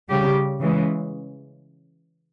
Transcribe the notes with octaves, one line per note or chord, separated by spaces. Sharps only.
C#3 G3 G4
C#3 E3 G#3